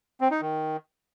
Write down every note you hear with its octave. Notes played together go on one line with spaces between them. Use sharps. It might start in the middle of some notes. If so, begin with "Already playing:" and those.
C4
D#4
D#3